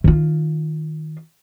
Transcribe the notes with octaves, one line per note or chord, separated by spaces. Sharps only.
D#3 F4